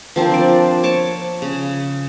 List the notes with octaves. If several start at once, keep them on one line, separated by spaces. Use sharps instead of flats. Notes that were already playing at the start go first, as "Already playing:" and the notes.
F3 C4 D4 A#4
C5 D5
C#5 A5 D6
C#3